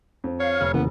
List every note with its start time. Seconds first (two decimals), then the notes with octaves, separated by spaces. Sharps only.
0.24 F2
0.40 C#5 F5
0.61 F1
0.74 C#3 E3 A#3 B3